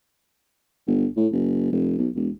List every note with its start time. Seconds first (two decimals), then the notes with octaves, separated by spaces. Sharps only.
0.87 G1
1.17 A2
1.32 F#1
1.72 F1
1.98 B1
2.15 E1